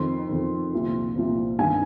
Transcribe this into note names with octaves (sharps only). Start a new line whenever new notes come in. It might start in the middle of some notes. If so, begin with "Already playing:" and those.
Already playing: F2 D#3 C6
F2 D#3
C2 A#2 F3
C2 A#2 F3
G2 D#3 G#5